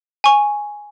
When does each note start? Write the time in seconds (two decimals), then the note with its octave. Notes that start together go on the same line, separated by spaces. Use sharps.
0.24 G#5 C#6